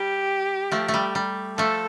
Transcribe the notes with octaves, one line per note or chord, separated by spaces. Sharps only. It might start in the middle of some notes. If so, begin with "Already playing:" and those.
Already playing: G3 G4
F3 A3
A3
G3
G3
F3 A3 A4